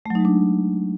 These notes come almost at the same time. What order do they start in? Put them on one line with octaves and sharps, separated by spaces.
A3 F#3 D#4 G#3 D4